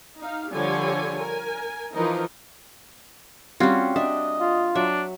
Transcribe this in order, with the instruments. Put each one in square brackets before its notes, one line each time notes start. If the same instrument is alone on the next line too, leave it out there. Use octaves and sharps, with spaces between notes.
[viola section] D#4 F5
D3 F3 G3 G4 C#5 G#5
A#4 G#5
E3 F3 D#4 A#4 D#5
[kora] G3 F4 F#4 [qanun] C4 C#4
[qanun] D4 [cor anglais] D#5 [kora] E5
[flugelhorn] F4
[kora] F#3 [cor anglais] D4 [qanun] E5